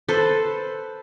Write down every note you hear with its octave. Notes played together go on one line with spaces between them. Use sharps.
A4 B4 C5